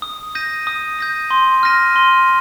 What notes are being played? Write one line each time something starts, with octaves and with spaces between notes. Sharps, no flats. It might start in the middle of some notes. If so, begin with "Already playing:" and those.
D#6
G6 A#6 D#7
D#6
G6 A#6 D#7
C6
F6 A#6 D#7
C6